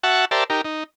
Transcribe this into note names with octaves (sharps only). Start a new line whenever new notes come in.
F#4 E5 F#5 A5 C#6
G4 A#4 C5 D5 E5 A5
D#4 G4 A#4
D#4